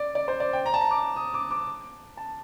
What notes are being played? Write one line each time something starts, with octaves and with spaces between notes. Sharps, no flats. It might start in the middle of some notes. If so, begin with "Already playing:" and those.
Already playing: D5
D5
C5
D5
G5
A#5
A5
A#5
D6
D#6
D6
D6
A5